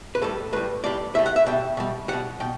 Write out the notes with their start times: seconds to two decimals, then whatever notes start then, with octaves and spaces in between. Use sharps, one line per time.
0.15 B4
0.22 A2 G3 A4
0.53 A2 G3 B4
0.84 A2 G3 D5
1.15 A2 G3 E5
1.26 F#5
1.36 E5
1.46 B2 G3 G5
1.77 B2 G3
2.08 B2 G3 F#5
2.40 B2 G5